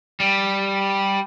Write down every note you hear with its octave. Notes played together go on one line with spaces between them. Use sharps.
G3